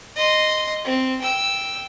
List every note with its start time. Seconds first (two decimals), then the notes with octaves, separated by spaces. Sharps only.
0.16 D#5 C6
0.85 C4
1.22 G5 E6